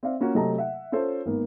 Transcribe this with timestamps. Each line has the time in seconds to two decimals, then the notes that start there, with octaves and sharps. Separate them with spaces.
0.03 C4 D5 E5 F5
0.20 A#3 C#4 F4 F#4
0.34 C3 F#3 A3 D#5 A5 A#5
0.58 E5 F#5
0.92 C#4 F4 A4 C5 C#5
1.26 G#1 A#3 B3 A#4